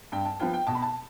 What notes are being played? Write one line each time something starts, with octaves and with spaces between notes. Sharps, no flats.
G2 G5
A5
F3 B3 F4 G5
G5
B2 A5
B5
A5